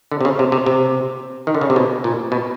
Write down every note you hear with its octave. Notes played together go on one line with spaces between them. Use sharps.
D3
C3
C#3
C3
C3
C3
D#3
D3
C#3
C3
B2
A#2
B2